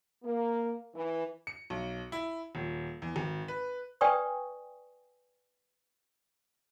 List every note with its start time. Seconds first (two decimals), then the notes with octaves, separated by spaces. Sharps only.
0.24 A#3
0.95 E3
1.47 C#7
1.70 B1
2.12 E4
2.55 D#1
3.02 E2
3.16 G#1
3.48 B4
4.01 B4 D5 G5 G#5 C#6 D#6